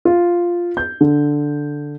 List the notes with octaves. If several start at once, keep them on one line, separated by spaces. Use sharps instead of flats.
F4
G6
D3